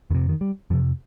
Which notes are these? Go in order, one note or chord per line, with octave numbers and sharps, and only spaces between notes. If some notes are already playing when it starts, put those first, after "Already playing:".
F2 C3 D#3
D#3
G3
F2 C3 F3